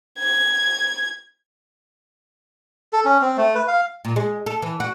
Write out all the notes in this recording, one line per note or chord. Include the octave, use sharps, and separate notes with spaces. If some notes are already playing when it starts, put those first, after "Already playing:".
G#6
A4
C#4
C4
A3
B4
F5
A#2
G#3
A4
E3
F#4